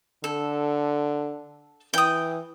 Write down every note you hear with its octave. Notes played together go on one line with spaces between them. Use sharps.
D3 A4
E3 G5 D#6